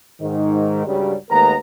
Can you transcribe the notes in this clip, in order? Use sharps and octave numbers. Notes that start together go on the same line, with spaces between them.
G#2 D#3
C#2 G2 C#3 F#3 G3
D#2 G#3 A3 B3 A#4 A#5